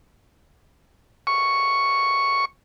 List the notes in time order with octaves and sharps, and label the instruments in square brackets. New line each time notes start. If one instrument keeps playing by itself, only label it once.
[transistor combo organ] C#6